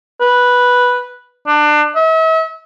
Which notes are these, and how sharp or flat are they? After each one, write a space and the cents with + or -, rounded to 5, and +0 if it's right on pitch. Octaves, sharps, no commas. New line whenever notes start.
B4 -5
D4 +25
E5 -40